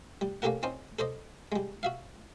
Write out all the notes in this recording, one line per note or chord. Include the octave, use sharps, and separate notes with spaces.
G3
A#3 C#4 G4 A4 A#4 F#5
C4 C#4 D#4 C5
A4 C5 D5 D#5
G3 G#3
F#4 E5 F5